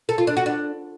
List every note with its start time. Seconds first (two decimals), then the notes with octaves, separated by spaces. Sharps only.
0.09 A4
0.18 F4
0.27 D4
0.37 F#4
0.46 D4